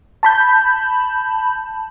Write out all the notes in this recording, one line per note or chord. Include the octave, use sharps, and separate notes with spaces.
A5 B5 G6